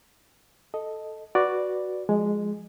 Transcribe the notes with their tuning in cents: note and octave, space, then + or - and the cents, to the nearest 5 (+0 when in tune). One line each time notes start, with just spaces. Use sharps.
A4 +0 D#5 +0
F#4 +0 B4 -5 D5 +0
F3 +10 G#3 +0 D#5 -30